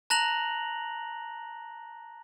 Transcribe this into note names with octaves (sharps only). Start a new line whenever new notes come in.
A5 A#5 F#6 A#6 F7 F#7